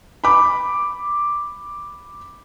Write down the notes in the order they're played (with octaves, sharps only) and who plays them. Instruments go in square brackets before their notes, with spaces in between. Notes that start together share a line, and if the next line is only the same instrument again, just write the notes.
[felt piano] B5 D6